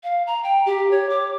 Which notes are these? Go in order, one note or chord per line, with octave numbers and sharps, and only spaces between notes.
F5
A#5
G5
G4
C#5
D6